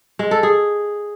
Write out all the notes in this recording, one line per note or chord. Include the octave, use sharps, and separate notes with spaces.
G#3
A4
G#4